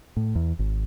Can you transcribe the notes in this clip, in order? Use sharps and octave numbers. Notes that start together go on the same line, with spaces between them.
A2
E2
G#1